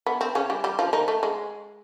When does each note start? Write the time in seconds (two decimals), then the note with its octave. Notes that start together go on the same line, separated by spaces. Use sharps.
0.06 B3
0.21 C4
0.35 C#3 C#4
0.50 G3 G4
0.64 G3 G4
0.79 F3 F4
0.93 D#3 D#4
1.08 A3
1.23 G#3